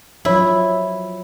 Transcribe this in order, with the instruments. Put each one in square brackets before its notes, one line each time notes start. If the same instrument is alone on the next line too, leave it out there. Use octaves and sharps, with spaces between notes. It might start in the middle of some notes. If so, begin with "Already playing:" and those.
[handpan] F3 F#3 C#5 [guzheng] E4